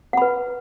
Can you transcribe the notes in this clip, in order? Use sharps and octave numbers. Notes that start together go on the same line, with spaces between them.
B4 F#5 B5